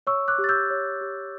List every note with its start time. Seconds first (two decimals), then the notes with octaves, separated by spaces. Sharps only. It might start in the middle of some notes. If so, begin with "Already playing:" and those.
0.07 C#5 C#6 E6
0.28 D6 F#6
0.38 G4
0.44 A6
0.49 E6 G6
0.70 C#5
1.01 G4